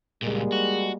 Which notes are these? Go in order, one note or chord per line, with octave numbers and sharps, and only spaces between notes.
C#2 A#2 G3 G#3 A#3
F#4